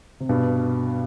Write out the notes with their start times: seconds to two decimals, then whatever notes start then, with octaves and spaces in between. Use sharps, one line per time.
0.20 C3
0.29 G2 B2